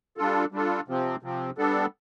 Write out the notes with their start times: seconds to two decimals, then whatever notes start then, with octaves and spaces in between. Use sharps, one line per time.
0.17 G3 D4 F4 A4
0.52 G3 D4 F4 A4
0.88 C3 F3 C4
1.23 C3 F3 C4
1.58 G3 B3 D4 A4